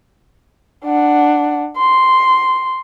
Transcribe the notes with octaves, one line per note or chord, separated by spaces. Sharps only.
D4 F#5
C6